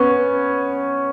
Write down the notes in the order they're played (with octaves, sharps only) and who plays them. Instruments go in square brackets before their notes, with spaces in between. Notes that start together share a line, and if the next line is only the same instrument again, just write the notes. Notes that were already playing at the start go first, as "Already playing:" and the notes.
Already playing: [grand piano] B3 C#4